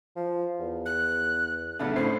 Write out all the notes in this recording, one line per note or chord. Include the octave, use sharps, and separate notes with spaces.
F3
E2
F#6
B1 C#3 A3 D4 F#5
A2 C4 C5 C#5 C7